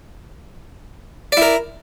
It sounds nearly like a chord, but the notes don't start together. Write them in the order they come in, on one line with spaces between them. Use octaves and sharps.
D5 E4 A#4